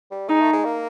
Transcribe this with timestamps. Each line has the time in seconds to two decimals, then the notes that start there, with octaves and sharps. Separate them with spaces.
0.11 G3
0.29 G#3 D#4
0.41 A3
0.53 G#3
0.65 A#3